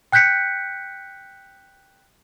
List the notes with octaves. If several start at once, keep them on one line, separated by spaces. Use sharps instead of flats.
G5 F#6 G6 B6 C#7